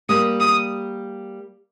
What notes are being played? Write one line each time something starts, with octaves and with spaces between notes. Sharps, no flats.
G3 A#3 D#6
D#6